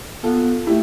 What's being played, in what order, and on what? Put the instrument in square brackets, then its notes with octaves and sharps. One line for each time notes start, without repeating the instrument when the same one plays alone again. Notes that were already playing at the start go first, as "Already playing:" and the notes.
[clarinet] B3 [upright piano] F4 A4
[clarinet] A3 [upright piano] E4 G4